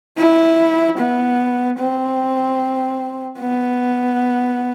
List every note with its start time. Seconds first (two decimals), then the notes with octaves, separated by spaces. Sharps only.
0.17 E4
0.98 B3
1.79 C4
3.40 B3